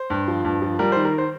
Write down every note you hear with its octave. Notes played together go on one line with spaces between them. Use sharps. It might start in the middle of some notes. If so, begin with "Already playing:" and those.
Already playing: C5
G2
F3
G2
F3
G3 A#4
C5
D#3
A#4
C5